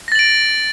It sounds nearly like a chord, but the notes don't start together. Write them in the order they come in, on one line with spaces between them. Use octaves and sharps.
A#6 A6 F#7 D7